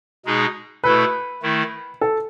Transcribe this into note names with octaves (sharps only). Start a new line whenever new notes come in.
B2 G#3 D#4 G#4
B2 A3 E4 A4 B4
D#3 A3 E4
A4